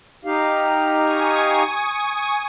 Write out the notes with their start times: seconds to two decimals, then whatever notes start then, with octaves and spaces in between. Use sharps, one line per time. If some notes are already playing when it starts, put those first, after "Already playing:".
0.25 D#4 G4 F5
1.03 G#5 C#6 D#6